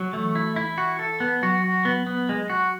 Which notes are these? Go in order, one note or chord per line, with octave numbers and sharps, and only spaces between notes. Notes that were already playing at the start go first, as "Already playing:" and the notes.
Already playing: F#3
E3 A3
E4
E4
F#4
A4
B3
F#3 F#4
F#4
B3
B3
G#3
F#4